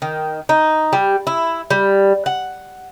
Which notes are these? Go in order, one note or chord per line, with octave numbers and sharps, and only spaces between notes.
D#3
D#4
G3
E4
G3
F#5